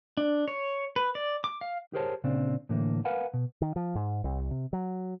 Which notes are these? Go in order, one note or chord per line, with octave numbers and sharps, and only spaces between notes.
D4
C#5
B4
D5
D6
F5
G4 G#4 A#4 C5 C#5 A5
A#2 C#3 C4 D4
A2 D3 E3 A#3
A#4 B4 F5 F#5 G#5 B5
B2
D#3
F3
G#2
C2
C3
F#3